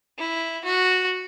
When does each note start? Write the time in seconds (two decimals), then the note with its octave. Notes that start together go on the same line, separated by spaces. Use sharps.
0.18 E4
0.64 F#4